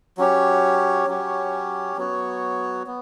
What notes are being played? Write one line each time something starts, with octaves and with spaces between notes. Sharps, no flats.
F#3 C#4 G4 C#5
F#3 C#4 G4 C#5
F#3 B3 F#4 C#5
B3